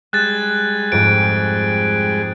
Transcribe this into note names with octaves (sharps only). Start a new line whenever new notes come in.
G3 G#3 G#4 F#6 A6 E7
F2 G#2 D7